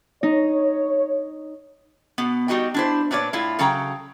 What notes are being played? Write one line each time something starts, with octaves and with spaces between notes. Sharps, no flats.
D#4 C#5
B2 B3
G3 D#4 F#4 D#5 G5
D4 E4 C5
A#2 D4 B4 C#5 D5
A2 E4 F4
C#3 F#3 A4 G5 A#5